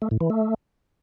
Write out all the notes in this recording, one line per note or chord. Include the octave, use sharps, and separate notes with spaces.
A3
A2
E3
A3